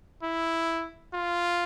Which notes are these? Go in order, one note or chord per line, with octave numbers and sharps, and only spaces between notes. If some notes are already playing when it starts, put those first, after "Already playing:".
E4
F4